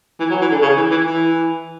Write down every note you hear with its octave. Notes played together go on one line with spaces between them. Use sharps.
E3
F#3
E3
D3
C#3
E3
E3
E3